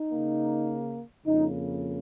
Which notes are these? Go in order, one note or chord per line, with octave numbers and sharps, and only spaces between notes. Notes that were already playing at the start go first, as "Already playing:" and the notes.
Already playing: D#4
C#3 A#3
F2 C#3 A#3 D#4